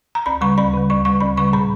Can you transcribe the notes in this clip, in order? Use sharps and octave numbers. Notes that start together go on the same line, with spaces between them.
A#5
D2 B5
C#3 G3 C#6
D2 B5
C#3 G3
D2 C#6
C#3 G3 C#6
D2 B5
C#3 G3 C#6
A#2 B5